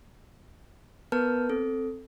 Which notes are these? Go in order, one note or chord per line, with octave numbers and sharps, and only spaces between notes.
B3 A#4 B4 A5 F6 G6
C4 A4